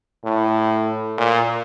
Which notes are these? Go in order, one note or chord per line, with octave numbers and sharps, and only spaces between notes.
A2
A#2